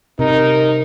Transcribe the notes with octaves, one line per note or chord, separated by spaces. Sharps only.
C3 D#4 A#4